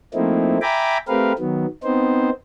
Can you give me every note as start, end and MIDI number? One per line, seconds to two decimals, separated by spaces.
0.14 0.58 53
0.14 0.58 57
0.14 0.58 58
0.14 0.58 60
0.14 0.58 63
0.14 0.58 64
0.62 0.98 76
0.62 0.98 79
0.62 0.98 80
0.62 0.98 82
0.62 0.98 83
0.62 0.98 86
1.08 1.33 57
1.08 1.33 60
1.08 1.33 67
1.08 1.33 70
1.08 1.33 71
1.08 1.33 77
1.39 1.66 51
1.39 1.66 54
1.39 1.66 59
1.83 2.30 59
1.83 2.30 60
1.83 2.30 63
1.83 2.30 72